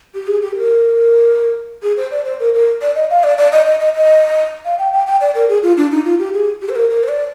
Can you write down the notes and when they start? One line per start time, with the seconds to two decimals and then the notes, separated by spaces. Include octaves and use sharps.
0.15 G4
0.28 G#4
0.42 G4
0.56 A#4
1.83 G#4
1.97 C5
2.11 D5
2.25 C5
2.40 A#4
2.54 A#4
2.81 D5
2.95 D#5
3.10 F5
3.24 D5
3.38 D5
3.52 D#5
3.66 D#5
3.80 D#5
3.95 D#5
4.65 F5
4.79 G5
4.93 G5
5.07 G5
5.21 D5
5.35 A#4
5.49 G#4
5.63 F4
5.77 D4
5.91 D#4
6.05 F4
6.19 G4
6.34 G#4
6.62 G4
6.69 C5
6.76 A#4
6.90 A#4
7.03 C5
7.08 D5